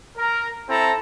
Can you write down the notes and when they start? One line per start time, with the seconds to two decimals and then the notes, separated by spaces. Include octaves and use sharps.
0.17 A#4
0.69 C4 E4 A4 A#5